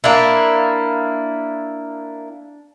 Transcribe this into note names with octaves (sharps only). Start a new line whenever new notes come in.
A#3 D4 E4